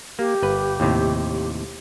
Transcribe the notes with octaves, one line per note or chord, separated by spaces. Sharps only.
A#3 G4
G1 B4
D#2 A2 C3